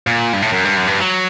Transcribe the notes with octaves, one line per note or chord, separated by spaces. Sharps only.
A#2
G2
A2
F#2
G2
F#2
G2
F#3